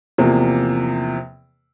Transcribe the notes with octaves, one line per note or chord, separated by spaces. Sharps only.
E2 C3 F3 A#3